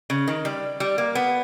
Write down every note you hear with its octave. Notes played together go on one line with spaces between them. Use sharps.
C#3
D#3
G3
G3
A#3
B3